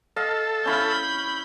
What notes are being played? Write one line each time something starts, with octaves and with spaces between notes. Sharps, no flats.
A4 D#5 F5
C#4 E4 F5 B5 G6